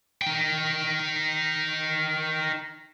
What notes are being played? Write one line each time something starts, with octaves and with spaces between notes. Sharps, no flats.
D#4 G5